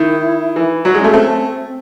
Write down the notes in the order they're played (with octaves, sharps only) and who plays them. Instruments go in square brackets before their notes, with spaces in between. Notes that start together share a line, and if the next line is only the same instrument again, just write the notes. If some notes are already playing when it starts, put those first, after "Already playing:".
Already playing: [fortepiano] D#3 [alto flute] E4
[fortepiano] E3
[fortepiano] F#3 [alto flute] F#4
[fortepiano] G#3
[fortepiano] A3 [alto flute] C#4
[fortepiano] A3 [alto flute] C4